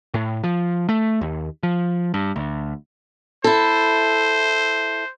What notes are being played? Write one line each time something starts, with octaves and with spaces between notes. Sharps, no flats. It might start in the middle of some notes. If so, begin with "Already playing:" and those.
A2
F3
A3
D#2
F3
G2
D2
E4 A4 C5